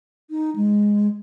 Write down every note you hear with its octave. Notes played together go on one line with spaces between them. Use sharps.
D#4
G#3